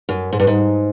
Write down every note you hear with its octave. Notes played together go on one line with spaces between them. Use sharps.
F#2
G#2
G2
G#2